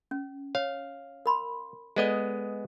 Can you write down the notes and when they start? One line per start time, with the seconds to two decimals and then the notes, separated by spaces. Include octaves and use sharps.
0.11 C#4
0.55 C#5 F5
1.26 A#4 B5 C6
1.96 G#3 B3 A4 D5 D#5 D#6